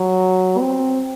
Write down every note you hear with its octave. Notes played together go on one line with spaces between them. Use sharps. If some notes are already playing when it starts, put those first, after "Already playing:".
Already playing: F#3
C4